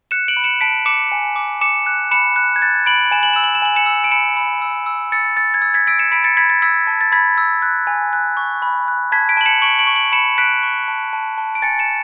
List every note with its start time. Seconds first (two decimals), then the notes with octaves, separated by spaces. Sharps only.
0.11 F#6 C#7 E7
0.28 D7 F#7
0.37 B5
0.44 C#7 E7
0.61 A5 B6 D7
0.86 D6 C#7 E7
1.12 G#5
1.36 D6
1.61 D6 C#7 E7
1.86 F#6
2.11 B5 C#7 E7
2.36 F#6
2.56 G#6
2.62 F#6 A6
2.86 B5 D7 F#7
3.11 G#5 E7
3.23 F#7
3.33 E6 E7
3.44 F#7
3.55 E7
3.62 G#5 F#7
3.76 C#7 E7
3.86 E6
4.04 D7
4.12 B5 C#7 E7
4.37 B5
4.62 E6
4.86 E6
5.12 E6 A6 C#7
5.37 E6 A6
5.54 G#6
5.62 E6 A6
5.74 G#6 B6
5.87 E6 B6 D7
5.99 C#7 E7
6.12 B5 B6 D7
6.24 A6 C#7
6.37 B5 G#6 B6
6.50 A6
6.62 E6 G#6 B6
6.87 A5
7.01 A6
7.12 B5 G#6 B6
7.38 E6
7.62 F#6
7.87 G#5
8.13 F#6
8.37 C#6
8.62 B5
8.88 F#6
9.12 A5 G#6 B6
9.29 B6 D7
9.37 A5 F#7
9.46 C#7 E7
9.62 C#6 D7 F#7
9.79 D7 F#7
9.87 C#6
9.96 D7 F#7
10.12 B5 C#7 E7
10.38 F#6 B6 D7
10.63 C#6
10.88 A5
11.13 A5
11.38 A5
11.55 D7
11.62 G#5 A6 C#7
11.79 C#7 E7